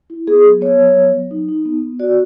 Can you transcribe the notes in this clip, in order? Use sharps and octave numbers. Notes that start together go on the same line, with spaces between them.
E4
B3 G#4
F#3
B3 C#5
F#3
B3
F#3
D#4
D#4
B3
B3
F#4 D5